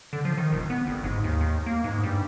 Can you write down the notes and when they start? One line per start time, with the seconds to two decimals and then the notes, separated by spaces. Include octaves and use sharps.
0.13 D3
0.25 F3
0.37 D#3
0.52 D#1
0.70 B3
0.87 G1
1.04 G#2
1.24 D#2
1.41 D#2
1.66 A#3
1.84 G#2
2.03 G2